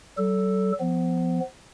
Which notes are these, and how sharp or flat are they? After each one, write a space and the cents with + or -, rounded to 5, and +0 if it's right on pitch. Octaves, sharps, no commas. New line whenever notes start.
F#3 +45 A4 +0
F3 +0 B3 +20